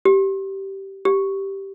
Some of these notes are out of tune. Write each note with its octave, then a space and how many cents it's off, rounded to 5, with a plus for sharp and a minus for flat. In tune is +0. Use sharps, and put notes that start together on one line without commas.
G4 -15
G4 -5